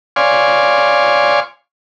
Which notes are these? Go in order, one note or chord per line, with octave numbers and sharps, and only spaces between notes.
C#5 D5 F5 G#5 C6